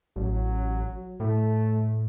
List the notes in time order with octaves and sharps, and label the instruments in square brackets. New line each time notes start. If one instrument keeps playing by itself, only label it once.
[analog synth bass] A1 [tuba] F#3
[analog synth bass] A2 [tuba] A3